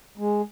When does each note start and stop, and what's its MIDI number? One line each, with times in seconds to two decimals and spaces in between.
0.18 0.42 56